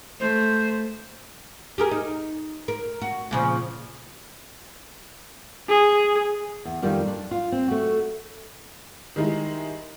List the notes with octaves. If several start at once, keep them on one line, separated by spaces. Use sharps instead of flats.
A3 C5
G4 G#4 A#4
D#4
A#4
F#4
A#2 C#3 F3
G#4
E2
F2 D#3 G3 F4
D4
F4
C4
A3 F#4
D#3 G3 G#3 D#4 E4